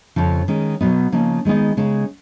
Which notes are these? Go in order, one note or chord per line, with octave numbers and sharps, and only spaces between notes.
F2 C#3 F3
D#3 G#3 C#4
B2 F#3 B3 D#4
C#3 F3 A#3 D#4
D#3 G#3 B3 D#4
C#3 G#3 D#4